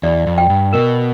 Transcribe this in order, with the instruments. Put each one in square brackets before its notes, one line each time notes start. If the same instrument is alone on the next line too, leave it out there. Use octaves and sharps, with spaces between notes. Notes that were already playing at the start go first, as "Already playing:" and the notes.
[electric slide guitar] E2 [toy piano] D5
[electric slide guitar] F2
[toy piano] G5
[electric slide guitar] G2
[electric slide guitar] B2 [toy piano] A#4